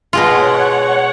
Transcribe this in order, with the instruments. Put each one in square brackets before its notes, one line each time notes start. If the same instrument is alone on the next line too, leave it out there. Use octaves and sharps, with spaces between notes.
[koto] B2 G#3 F4 [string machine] C#5 F#5